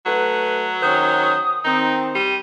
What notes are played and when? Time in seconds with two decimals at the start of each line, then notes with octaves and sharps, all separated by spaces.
0.06 F#3 A3 B4
0.83 D#3 C#4 C5 D#6
1.65 D#3 C4 D#4
2.15 G3 D#7